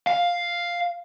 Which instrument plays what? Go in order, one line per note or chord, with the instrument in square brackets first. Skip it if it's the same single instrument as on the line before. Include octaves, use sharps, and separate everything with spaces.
[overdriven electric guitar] F5